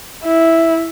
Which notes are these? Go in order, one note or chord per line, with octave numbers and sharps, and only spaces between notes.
E4